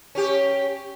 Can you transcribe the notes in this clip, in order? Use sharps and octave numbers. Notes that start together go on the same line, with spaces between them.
C#4 G4